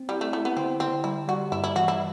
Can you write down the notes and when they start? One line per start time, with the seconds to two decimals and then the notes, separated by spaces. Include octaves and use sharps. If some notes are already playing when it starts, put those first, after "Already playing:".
Already playing: C4
0.09 G3 E4
0.21 A3
0.33 A3 E4
0.45 B3
0.57 D3 C4
0.80 D3 C4
1.04 G3 E4
1.27 G3 F#4
1.52 G2 E4
1.64 E4
1.76 E3 F#4
1.88 E4